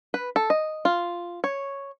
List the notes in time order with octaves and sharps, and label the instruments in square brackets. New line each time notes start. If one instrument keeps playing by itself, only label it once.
[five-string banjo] B4
A4
D#5
F4
C#5